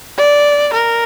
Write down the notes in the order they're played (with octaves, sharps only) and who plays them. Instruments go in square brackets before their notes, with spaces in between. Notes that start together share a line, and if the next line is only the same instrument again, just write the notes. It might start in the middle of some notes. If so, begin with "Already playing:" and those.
[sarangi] D5
A#4